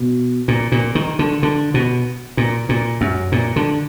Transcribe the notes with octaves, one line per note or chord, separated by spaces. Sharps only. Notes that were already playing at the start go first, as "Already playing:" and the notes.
Already playing: B2
A#2
A#2
D#3
D3
D3
B2
A#2
A#2
F#2
A#2
D3